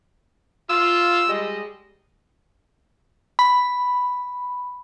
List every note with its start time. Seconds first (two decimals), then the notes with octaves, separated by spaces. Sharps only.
0.69 F4 E6
1.28 G3 G#3 D#5
3.39 B5